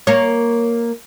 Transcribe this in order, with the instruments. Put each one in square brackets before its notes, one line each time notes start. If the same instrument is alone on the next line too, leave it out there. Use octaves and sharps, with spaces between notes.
[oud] A#3 C#5